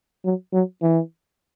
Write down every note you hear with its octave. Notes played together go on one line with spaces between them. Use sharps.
F#3
F#3
E3